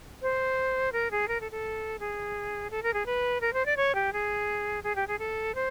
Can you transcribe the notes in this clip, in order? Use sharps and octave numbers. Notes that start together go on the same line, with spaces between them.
C5
A#4
G#4
A#4
A4
A4
G#4
A4
A#4
G#4
B4
A#4
C5
D5
C#5
G4
G#4
G#4
G4
G#4
A4
C5